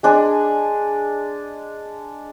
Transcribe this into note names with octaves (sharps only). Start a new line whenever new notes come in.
G#3 D4 G#5